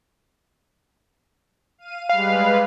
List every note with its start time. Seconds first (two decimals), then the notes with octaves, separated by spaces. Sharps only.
1.78 F5 D#7
2.09 G3 G#3 B4 F5